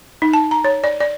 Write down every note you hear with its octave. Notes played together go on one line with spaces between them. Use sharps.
D#4
A5
A#5
C#5
D5
D5